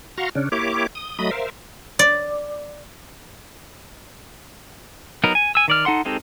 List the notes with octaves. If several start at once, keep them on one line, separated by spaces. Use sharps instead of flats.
F#4 F5 A#5 C6 C#6
C#3 C#4 D4
A#3 E4 G4 C#5 D6
D#6
F#3 A3 D#5 B5 D#6
A#4 C5 E5 F5
D5
F#3 B3 D#4 A#4
G#5
G#5 E6
D#3 D5 F6
D#4 A4 F#5 C6
G#3 C4 D#4 G4 A4